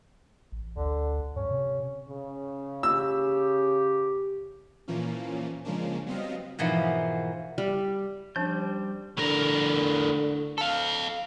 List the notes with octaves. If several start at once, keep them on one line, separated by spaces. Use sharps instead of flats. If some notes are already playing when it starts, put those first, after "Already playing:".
A1
D2 D3
G2 C#4
C3
C#3
G4 E6
A#2 E3 F3 A#3 C#4
C#3 F3 G#3 A#3 C#4 D4
F#3 G3 B3 C4 D#5 F5
G#2 B2 E3 F3 A#3 B3
G3
F3 G3 C#4 D4 C5 G6
A2 D3 A#4
A4 F5